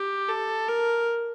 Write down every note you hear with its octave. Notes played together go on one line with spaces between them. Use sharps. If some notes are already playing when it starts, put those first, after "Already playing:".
Already playing: G4
A4
A#4